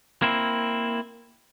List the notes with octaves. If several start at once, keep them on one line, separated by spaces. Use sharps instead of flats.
A#3 C4 E4